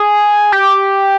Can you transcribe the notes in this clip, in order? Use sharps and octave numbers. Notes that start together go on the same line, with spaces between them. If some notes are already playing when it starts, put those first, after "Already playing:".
Already playing: G#4
G4